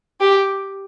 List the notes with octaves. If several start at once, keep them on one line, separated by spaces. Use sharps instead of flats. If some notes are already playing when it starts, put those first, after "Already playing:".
G4